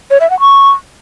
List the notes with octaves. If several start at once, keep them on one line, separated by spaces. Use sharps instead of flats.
C#5
E5
F#5
C#6